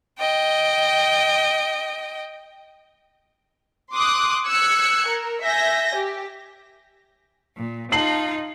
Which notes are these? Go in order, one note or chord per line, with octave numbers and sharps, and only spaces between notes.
D#5 G5
C6 D6 D#6 F#6
E6 F#6 G#6 C#7
A#4
E5 G#5 G6 A#6
G4
A#2
D#4 F4 A5 C7 F#7